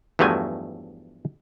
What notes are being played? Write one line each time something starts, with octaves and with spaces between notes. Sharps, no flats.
E2 G2 F3 F#3 A3 G#5